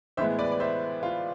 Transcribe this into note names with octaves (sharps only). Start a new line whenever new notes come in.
A2 E3 G#3 B3 C5 E5
B4 D5
D5
C5 E5
F4